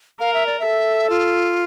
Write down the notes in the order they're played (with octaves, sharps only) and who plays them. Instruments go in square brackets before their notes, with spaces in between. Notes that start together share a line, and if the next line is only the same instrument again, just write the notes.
[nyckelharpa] A#4 [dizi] F5
[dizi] E5
D5
E5
[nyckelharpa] A4
[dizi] F4